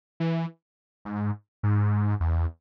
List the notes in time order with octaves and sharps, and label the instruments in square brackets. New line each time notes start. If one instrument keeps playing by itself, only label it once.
[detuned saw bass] E3
G#2
G#2
E2